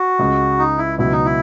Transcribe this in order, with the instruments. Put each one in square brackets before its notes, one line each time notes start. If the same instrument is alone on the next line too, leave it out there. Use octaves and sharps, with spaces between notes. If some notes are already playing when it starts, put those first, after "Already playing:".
Already playing: [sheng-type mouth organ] F#4
[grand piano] C#2 C#3 G#3
[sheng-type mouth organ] D#4
E4
[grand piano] C#2 B2 F#3 [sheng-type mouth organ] E4
[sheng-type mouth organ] D#4
E4